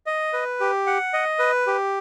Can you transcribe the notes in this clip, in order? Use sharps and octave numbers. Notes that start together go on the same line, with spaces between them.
D#5
B4
G4
F#5
D#5
B4
G4